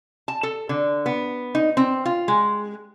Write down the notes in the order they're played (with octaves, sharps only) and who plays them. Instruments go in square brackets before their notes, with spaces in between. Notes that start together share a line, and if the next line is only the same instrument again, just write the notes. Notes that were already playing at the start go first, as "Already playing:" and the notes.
[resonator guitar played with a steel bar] A5
A4
D3
B3
D#4
C4
F4
G#3